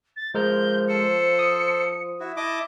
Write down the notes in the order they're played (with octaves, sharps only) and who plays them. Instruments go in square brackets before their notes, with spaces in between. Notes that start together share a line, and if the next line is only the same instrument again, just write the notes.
[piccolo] A6
[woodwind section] F3 [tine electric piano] G#3 A#4 F6 [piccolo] G6
[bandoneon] A4 C5 [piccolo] C#7
[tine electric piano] D#6
[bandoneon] E4 F#4
[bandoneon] E4 D#5 D6 [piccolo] A5